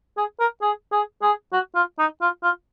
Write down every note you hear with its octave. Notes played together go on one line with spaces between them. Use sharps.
G#4
A#4
G#4
G#4
G#4
F#4
F4
D#4
F4
F4